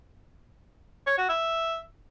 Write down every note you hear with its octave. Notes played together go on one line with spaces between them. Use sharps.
C#5
F#4
E5